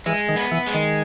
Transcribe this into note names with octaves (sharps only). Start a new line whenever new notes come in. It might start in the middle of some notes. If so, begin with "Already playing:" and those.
E3 G#3
D#3
B3
E3
G#3
D#3